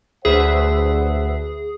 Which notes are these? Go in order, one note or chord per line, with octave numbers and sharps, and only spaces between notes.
D2 G#4 B4 C5 E5 F#5